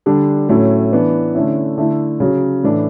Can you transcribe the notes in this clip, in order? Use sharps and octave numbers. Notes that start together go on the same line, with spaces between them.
D3 G3 D4
A2 F#3 A3 C#4
E3 B3 D4
D3 A3 C#4 E4
D3 A3 E4
C#3 F#3 C#4
A2 E3 A3 D4